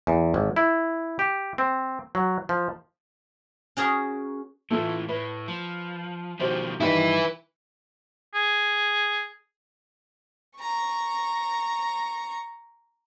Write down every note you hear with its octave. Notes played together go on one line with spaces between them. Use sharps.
E2
G#1
E4
G4
C4
F#3
F3
C#4 F#4 G#4 A#4
A2 E3 A3 F4
A2 B4
F3
B2 D#3 F3 F#4 G4 C5
G2 D#3 G3 E4 B4 D5
G#4
A#5 C#6